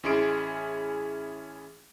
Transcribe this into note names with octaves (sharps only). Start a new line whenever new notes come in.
A1 C#4 E4 G#4 C6 D7